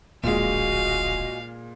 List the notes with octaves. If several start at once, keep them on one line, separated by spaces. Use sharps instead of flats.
D1 A#1 A#2 G#3 F#4 D#5 F5 G#5